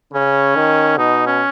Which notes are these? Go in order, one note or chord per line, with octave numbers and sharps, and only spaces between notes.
C#3 C#4
D#3
B2 D#4
C#4